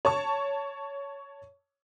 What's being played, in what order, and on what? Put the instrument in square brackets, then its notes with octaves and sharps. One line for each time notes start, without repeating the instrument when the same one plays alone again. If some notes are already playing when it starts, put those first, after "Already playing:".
[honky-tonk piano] C#5 A5 C#6